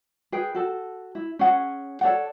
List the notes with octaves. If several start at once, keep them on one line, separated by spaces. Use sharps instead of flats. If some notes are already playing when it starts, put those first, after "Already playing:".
G#4 B4 G5
F#4 A4 A5
E4
C#4 G#4 F#5
A4 C#5 D5 F#5